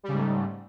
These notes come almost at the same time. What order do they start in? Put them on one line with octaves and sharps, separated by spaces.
G3 C#3 G#2 A3